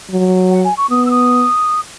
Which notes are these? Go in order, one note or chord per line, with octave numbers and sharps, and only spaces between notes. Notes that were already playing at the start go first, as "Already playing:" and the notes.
F#3
F#5
G#5
C#6
B3 D#6
E6
D#6